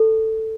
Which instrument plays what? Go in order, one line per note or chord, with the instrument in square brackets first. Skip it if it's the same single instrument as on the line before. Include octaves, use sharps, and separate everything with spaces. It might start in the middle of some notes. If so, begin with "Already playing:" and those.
Already playing: [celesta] A4